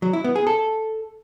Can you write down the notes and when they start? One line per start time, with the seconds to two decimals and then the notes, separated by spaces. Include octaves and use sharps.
0.02 F#3
0.13 E4
0.24 B3
0.36 G#4
0.47 A4